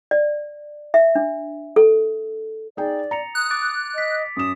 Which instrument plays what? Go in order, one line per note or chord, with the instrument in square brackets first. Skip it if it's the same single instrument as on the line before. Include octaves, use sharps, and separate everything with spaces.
[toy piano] D5
E5
D4
A4
[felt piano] D#4 G#4 G5 [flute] D5
[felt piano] A#5 [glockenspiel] A6 C#7 F7
[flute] D#6 [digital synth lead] F#6
[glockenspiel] D6 A6 D7
[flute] D#5 [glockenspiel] D6 B6
[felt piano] F#2 E7 [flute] D#6